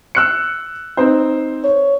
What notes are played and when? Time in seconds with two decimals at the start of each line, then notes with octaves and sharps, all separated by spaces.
0.15 E6 F#6 C#7
0.97 C4 D#4 C5
1.64 C#5